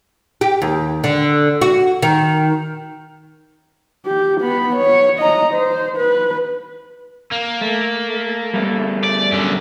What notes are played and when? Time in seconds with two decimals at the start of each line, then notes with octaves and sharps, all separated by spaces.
0.41 G4
0.62 D#2
1.04 D3
1.62 F#4
2.02 D#3
4.06 G4
4.41 B3 B5
4.76 C#5
5.19 D#5 A#5
5.54 C5
5.97 B4
7.32 A#3
7.61 A3
8.54 G3 A3 B3
9.04 D5
9.32 F#2 D3